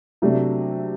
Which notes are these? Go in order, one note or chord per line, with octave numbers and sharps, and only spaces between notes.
C3 F#3 A3 D4